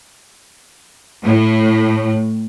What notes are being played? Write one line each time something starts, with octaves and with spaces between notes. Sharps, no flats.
A2